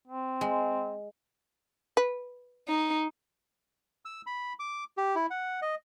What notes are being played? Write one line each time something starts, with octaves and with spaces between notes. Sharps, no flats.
C4
G#3
B4
D#4
E6
B5
D6
G4
E4
F#5
D#5